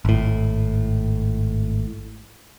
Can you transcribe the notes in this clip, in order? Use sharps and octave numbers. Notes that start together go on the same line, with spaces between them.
G#1 A2